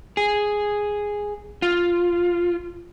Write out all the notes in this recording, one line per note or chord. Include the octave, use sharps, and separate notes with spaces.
G#4
F4